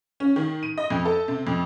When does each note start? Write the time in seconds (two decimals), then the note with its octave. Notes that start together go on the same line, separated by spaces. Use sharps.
0.20 C#4
0.36 D#3
0.63 D#7
0.78 D#5
0.90 F2
1.05 A4
1.28 C3
1.47 F2